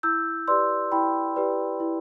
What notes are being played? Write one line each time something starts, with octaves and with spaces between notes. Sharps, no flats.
E4 E6 G6
G4 B4 D5 C6 E6
E4 G5 B5
G4 B4 D5
E4